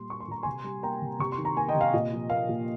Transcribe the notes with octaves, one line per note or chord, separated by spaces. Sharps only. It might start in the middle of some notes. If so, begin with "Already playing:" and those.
Already playing: A#2 G3 C6
A#3 C#6
C6
A#2 A#5
C3 G#5 C6
G3
A#3 G5 A#5
C3
C3 C#6
C6
D#3
A#5
A#3 G#5
D#5 G5
C3
F5
A#2 D#5
F3
A#3 F5
A#2